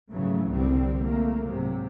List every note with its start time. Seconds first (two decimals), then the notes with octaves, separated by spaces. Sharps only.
0.11 G#2 C#3 E3 F#3 A3
0.50 C2 D3 G3 C4
1.04 A3 A#3
1.44 G#2 C3 F#3